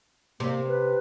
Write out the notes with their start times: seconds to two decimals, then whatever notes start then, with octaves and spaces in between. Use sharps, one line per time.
0.40 C3 A#3
0.67 B4